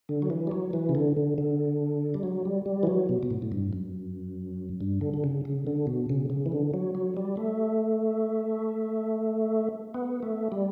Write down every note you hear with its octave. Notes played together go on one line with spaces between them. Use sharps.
D3
F#3
E3
G3
F#3
E3
C#3
D3
D3
D3
G3
F#3
G3
G3
E3
F#3
B2
B2
A2
A2
G2
F#2
G2
D3
D3
C#3
C#3
D3
B2
C#3
C#3
E3
D3
F#3
F#3
G3
A3
B3
A3
G3